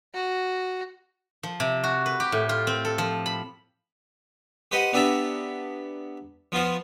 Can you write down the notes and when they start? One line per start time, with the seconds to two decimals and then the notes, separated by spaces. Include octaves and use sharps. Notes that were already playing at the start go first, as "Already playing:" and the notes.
0.14 F#4
1.43 F3
1.60 C3
1.84 F#4
2.06 B4
2.20 G4
2.32 A2
2.49 F4
2.67 C4
2.85 A4
2.98 F3
3.26 B5
4.71 G4 B4 C5 D#5 F#5
4.93 B3 D4 G4 E5 A5 A#5
6.52 F3 B3 F4 C5